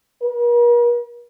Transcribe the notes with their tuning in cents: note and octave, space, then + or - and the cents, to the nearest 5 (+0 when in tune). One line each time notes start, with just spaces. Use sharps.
A#4 +45